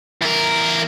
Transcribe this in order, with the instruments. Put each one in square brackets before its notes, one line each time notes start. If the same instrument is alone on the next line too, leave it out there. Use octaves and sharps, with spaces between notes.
[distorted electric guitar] E2 A#4